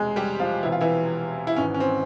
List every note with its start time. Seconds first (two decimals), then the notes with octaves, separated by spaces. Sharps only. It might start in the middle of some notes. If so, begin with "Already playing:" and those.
Already playing: E1 E2 C3 G#3 G#4
0.16 G3 G4
0.40 F3 F4
0.63 E1 E2 C3 E3 E4
0.72 F4
0.81 E3 E4
1.47 E4
1.56 G#1 G#2 E3 C#4
1.74 C#4
1.80 C4